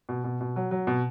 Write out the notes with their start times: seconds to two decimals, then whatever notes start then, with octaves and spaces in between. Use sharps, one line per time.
0.09 B2
0.24 B2
0.41 B2
0.56 F#3
0.71 F#3
0.87 B2